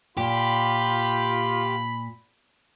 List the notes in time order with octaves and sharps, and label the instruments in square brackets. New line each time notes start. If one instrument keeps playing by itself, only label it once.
[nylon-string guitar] A#2 [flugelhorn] F4 [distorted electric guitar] G4 [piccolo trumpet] B5